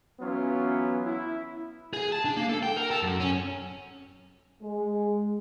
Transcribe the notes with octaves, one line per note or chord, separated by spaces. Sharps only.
E3 F#3 B3 C#4 E4 F4
E4
G#4
A5
D4
A#3
A4
G5
A#4
A4
F#2
C#4
G#3